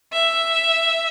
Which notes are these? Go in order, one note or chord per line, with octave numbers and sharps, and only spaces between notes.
E5